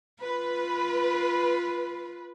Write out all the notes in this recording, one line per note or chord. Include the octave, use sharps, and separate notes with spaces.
F4 B4